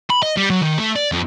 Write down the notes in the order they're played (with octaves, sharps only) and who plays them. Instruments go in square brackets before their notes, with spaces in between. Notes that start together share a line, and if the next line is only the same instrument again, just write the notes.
[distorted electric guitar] B5
D#5
G3
F#3
D#3
A3
D5
F2